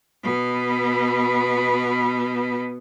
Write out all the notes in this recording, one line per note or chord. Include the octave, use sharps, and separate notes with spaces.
B2 B3